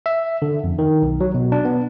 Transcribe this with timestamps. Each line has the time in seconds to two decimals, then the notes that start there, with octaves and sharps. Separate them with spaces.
0.06 E5
0.42 D3
0.64 F2
0.79 D#3
1.02 B1
1.21 F#3
1.34 B2
1.52 D4
1.65 B3